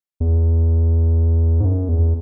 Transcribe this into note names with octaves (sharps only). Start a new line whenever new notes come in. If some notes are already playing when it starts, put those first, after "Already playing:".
E2
G#2
F#2
E2